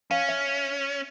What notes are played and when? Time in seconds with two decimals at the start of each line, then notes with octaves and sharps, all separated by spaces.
0.11 C#4 F5
0.29 E5